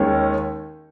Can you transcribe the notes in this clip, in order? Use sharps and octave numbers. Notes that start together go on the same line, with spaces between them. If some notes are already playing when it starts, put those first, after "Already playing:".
Already playing: D#2 D#3 G#3 C#4